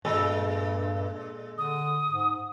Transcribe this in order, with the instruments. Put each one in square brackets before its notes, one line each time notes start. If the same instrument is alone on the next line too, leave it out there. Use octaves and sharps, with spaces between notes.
[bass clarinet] G2 [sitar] A#2 G#3 A4
[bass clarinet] D3 [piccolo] D#6
[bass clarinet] G#2